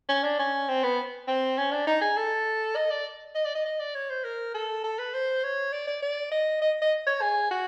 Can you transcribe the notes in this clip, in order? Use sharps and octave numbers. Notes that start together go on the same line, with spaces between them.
C#4
D4
C#4
C4
B3
C4
C#4
D4
D#4
G#4
A4
D#5
D5
D#5
D5
D#5
D#5
D5
C#5
C5
A#4
A4
A4
B4
C5
C#5
D5
D5
D5
D#5
D#5
D#5
C#5
G#4
F#4